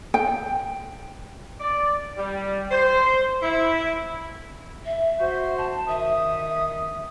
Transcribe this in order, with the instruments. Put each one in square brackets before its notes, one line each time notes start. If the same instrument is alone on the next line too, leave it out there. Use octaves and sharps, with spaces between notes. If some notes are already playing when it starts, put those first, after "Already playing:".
[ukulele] G5
[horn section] D5
G3
C5
E4
[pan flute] E5
[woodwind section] F#4 C5
[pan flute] A5
[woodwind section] D#3 D#6 [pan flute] E5